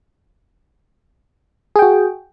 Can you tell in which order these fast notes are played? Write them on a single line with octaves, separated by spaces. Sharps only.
G#4 G5 F#4